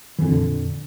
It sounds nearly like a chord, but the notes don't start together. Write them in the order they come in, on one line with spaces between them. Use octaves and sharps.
E3 F2 A#2 D3